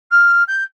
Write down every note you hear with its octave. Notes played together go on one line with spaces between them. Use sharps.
F6
G6